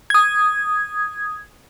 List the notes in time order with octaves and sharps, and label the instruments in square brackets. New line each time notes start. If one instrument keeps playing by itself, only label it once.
[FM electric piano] D#6 G#6